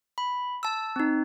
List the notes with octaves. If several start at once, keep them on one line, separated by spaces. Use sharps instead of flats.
B5
A5 E6
C4 D#4